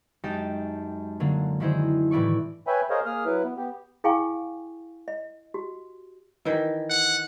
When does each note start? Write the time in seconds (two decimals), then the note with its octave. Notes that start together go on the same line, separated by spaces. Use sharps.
0.24 F#2 G#3 D#4 G4 A5
1.20 D3 F#3 A#3
1.60 D#3 D4 E4 G#4 C5
2.11 A2 E3 E4 D5 C#6
2.67 B4 C#5 E5 G5 G#5 B5
2.90 G#4 A#4 C5 C#5 D#5 F5
3.06 A#3 G#4 D#6 F6
3.25 F#3 E4 B4
3.44 B3
3.57 B3 G4
4.04 E4 G#4 F5 G5 G#5 C#6
5.08 D#5
5.54 F#4 G4
6.45 D#3 E3 E4
6.90 F#5